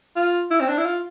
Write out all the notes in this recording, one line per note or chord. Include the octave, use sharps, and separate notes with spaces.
F4
E4
C4
D4
E4
F4